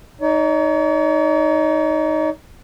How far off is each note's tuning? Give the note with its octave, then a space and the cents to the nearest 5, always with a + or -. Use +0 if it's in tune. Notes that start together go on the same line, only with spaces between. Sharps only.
D#4 +0 C#5 +45